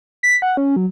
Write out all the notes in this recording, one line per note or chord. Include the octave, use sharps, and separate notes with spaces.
B6
F#5
C#4
F#3